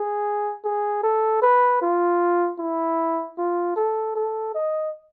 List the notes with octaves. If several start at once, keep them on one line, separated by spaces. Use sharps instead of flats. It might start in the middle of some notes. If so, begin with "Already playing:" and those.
Already playing: G#4
G#4
A4
B4
F4
E4
F4
A4
A4
D#5